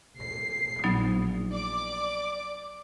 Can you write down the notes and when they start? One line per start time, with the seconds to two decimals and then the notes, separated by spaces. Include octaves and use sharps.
0.20 C7
0.84 A#1 F#3 B3 D#4
1.51 D5 D6